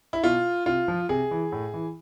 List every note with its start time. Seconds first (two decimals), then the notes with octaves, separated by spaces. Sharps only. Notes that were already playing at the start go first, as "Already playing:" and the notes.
0.13 E4
0.24 B2 F4
0.66 C3 F4
0.88 F3
1.09 C3 G#4
1.31 E3
1.52 A2
1.74 E3